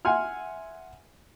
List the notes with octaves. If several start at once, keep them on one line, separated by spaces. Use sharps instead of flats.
E5 F#5 G#5 C6 F6